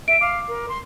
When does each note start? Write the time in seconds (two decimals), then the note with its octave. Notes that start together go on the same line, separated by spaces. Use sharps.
0.08 E5 D7
0.21 F5 D6
0.48 A#4
0.69 C6